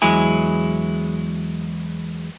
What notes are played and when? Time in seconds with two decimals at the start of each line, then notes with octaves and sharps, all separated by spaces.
0.02 E2 F#3 G#3 E4 G#5